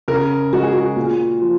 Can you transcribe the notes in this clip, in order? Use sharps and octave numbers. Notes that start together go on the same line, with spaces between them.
C#3 A#4
G#3 F#4
G#4
F#4
A#2
F3